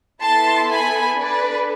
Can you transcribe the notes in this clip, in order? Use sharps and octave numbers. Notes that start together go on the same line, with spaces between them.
B3 E4 A4 A5 C6
G#5 B5
D4 A4 B4 D5